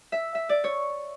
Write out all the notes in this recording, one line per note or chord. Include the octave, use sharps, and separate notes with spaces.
E5
E5
D5
C#5